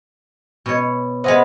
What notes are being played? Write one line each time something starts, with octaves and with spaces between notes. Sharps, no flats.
B2 C#5
B3 G#4 C5 D#5 E5 F#5